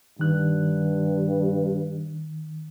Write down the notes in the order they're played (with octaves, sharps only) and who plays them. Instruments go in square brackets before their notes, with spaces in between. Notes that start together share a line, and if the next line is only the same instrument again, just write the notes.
[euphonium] G2 [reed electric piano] D#3 F#6